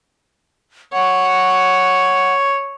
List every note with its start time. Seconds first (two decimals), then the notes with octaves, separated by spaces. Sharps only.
0.93 C#5 F#5